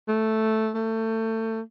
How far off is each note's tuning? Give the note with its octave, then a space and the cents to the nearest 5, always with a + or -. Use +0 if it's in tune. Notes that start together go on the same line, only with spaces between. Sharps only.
A3 -5
A3 +25